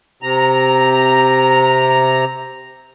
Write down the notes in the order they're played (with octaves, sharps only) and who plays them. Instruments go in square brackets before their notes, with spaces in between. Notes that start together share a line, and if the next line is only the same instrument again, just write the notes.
[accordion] C3 A#5